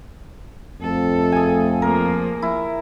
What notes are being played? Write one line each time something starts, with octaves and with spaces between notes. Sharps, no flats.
F2 A3 A4
G#4 G#5
F3 A#3 A#4
E4